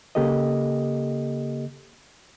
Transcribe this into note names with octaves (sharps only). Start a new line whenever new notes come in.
C#3 A#3 G4 A4 D#5